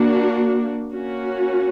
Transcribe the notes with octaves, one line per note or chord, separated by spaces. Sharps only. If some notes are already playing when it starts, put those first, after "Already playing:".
Already playing: A#3 D4 F#4
A#3 C#4 F#4